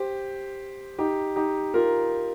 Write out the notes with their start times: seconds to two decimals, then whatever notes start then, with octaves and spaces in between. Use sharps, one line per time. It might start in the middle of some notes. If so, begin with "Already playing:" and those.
Already playing: G4 C5
0.98 D#4 G4
1.36 D#4 G4
1.74 F4 A#4